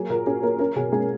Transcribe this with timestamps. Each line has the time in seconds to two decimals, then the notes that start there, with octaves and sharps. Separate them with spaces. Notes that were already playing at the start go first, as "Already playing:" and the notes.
Already playing: F#3 A#3 G#4
0.10 A#2 A#4
0.27 C#4 G#4
0.43 A#3 A#4
0.59 C#4 A#4
0.76 B2 G#4
0.92 G#3 G#4